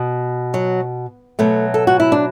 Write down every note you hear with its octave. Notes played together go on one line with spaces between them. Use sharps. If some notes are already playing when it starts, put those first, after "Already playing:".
Already playing: B2
F#3
B2 F#3 A3
A4
F#4
E4
D4